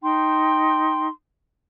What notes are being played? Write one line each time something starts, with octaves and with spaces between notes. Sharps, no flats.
D#4 G5 C6